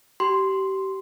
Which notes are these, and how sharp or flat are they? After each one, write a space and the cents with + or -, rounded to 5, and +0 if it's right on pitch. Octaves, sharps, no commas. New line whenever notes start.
G4 -30 C6 +0